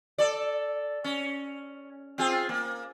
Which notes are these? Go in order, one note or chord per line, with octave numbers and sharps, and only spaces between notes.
A4 D5
C#4
C4 F4 G#4
A#3